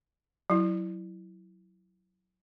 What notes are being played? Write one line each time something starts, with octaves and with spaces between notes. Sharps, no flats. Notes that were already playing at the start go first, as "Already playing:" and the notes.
F#3 E4